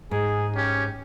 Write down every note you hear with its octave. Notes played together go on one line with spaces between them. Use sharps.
G#2 G#4
C#4 G4